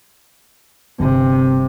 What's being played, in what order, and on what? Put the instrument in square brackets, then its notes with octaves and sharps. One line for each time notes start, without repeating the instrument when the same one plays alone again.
[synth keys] G1 [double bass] C3